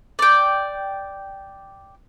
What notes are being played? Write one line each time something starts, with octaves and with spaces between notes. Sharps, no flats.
D5 G5